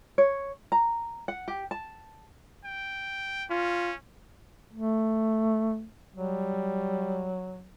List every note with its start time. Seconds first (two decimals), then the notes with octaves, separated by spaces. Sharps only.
0.18 C#5
0.72 A#5
1.28 F#5
1.48 G4
1.71 A5
2.65 G5
3.50 C#4 F4
4.73 A3
6.16 F#3 G3